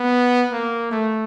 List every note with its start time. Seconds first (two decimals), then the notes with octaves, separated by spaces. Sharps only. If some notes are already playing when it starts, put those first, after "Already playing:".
Already playing: B3
0.52 A#3
0.91 A3